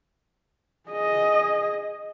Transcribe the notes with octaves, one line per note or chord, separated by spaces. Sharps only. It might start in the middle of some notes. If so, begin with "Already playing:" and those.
G#4 D#5